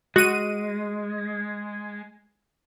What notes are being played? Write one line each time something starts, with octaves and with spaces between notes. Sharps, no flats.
G#3 F#4 D#7